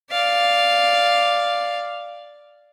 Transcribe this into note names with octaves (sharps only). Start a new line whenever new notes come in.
D5 F5